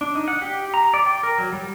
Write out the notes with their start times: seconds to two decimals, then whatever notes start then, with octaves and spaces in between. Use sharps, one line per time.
0.01 D4
0.15 D#4
0.28 F#5
0.42 G4
0.74 A#5
0.94 D5
1.06 G5
1.23 A#4
1.38 F#3
1.53 G3